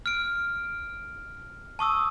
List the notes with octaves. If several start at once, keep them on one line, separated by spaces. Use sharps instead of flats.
F6 D7
A5 C#6 D#6 E6